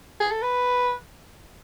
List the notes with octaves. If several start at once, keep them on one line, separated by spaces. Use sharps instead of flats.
G#4
A4
B4